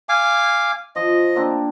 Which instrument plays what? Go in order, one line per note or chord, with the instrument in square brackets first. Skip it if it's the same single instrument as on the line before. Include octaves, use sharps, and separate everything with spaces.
[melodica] F5 G#5 D6
[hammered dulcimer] F3 [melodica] D#5
[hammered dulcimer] A#3 C4 D4